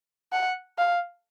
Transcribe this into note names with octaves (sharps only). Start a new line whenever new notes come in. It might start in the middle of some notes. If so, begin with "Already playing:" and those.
F#5
F5